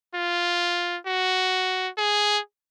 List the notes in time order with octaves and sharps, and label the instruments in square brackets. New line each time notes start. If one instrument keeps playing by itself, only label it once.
[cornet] F4
F#4
G#4